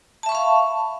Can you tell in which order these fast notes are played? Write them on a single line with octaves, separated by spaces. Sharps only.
A5 E5 C#6 B5 F5